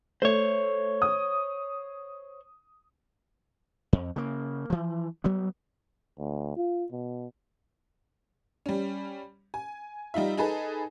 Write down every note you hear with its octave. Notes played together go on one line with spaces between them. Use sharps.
A3 C5 C#5
D#6
F2
C#3 A#3
E3 F3
F#3 G3 B3
D2
F4
B2
G3 C#4
G#5
G3 D#4 F4 E5
D#4 G#4 A4 B4 G#5